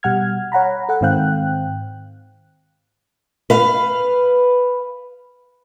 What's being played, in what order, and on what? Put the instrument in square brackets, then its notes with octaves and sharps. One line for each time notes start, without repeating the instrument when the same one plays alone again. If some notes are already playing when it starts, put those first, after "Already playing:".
[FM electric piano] B2 G3 F#5 F6 G#6
C#5 F#5 A#5 B5
A4 F#5
G#2 D#3 C4 F5 G5 F#6
[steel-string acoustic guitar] B4 F5